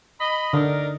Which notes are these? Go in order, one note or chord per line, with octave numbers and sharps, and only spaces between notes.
D#5 B5
D3 D4 D#4 A#4